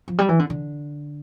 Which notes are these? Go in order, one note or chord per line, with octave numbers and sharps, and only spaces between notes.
F3
G3
E3
D3
D3